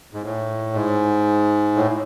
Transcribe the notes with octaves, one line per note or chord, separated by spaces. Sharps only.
G#2
A2
G#2
A2